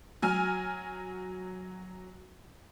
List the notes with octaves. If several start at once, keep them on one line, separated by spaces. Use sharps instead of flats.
F#3 G#5 F6